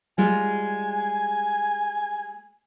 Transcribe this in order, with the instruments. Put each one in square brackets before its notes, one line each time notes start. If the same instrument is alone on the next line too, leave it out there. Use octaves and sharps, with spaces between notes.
[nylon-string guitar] G3 G#3 F4 [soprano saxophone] G#5